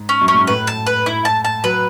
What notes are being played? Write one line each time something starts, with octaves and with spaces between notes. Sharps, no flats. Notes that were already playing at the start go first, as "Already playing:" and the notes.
Already playing: G#2
C#4
F#2
C#4
G#2
A2 B4
A5
B4
E4
A5
A5
F#3 B4